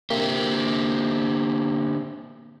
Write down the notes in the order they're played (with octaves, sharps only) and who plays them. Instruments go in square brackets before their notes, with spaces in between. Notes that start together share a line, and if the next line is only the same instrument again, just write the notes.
[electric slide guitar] D3 C4 G4 [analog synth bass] A#3